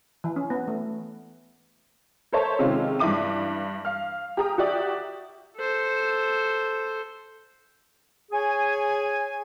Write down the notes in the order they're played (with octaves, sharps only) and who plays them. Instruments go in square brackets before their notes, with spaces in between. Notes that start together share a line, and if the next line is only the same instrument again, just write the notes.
[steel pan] E3
C#4
B3
A3
[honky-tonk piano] A4 A#4 C5 C#5 E5 A5
C3 D#3 G#3 C#4 F4
G2 E3 E5 D6 D#7
F5 F6
G4 G#4 A#5 D#6
F#4 G4 D5 E5
[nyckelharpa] A4 C5
[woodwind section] G#4 C#5 G#5